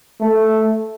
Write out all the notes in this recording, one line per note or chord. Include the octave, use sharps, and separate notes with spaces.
A3